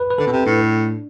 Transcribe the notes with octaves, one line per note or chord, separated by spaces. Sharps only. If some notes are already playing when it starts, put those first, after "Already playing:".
Already playing: B4
B4
D3 A4
B2
C3
A2 D4